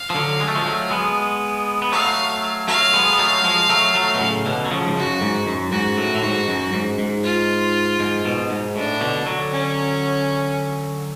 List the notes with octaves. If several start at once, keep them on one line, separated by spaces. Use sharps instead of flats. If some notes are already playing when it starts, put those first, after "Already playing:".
Already playing: F5
F3
D3 F#3
G#3
A3
F3 G#3
F#3 A3
G#3 B3
B3
F#3 A3 F5
F#3 A3 F5
G#3 B3
B3
F#3 A3
F3 G#3
F#3 A3
F#3 A3
B2
A2 C#3
B2 D3
F#3
C#3 F3
G#2
F#2 F#4
G#2
F#2
G#2 F#4
A2
A2
G#2
F#2
G#2
G#2
F4
G#2
G#2 B2
G#2
A2 D4
B2 D3
D3 F#3
C#4